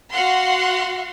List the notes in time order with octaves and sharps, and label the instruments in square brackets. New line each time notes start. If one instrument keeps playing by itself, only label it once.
[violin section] F#4 F5 F#5 C6